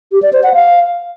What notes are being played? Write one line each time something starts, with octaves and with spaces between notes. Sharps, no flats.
G4
D5
C5
F#5
F5